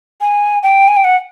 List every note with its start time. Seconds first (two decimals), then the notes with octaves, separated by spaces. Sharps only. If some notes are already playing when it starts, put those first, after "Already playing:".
0.21 G#5
0.63 G5
0.88 G#5
0.97 G5
1.04 F#5